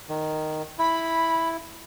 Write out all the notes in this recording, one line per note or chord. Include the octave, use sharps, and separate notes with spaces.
D#3
E4 B5